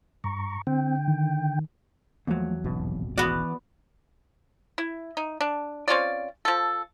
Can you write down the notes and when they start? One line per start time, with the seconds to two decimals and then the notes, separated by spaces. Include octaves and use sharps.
0.24 G2 A#5 C#6
0.67 D3 C4 G5
1.08 D#3
2.27 E2 F3 F#3 A3 A#3
2.64 D#1 G#1 B2
3.18 E3 B3 F#4 D5
4.78 E4
5.17 D#4
5.41 D4
5.88 C4 C#4 F4 D5
6.45 F3 A4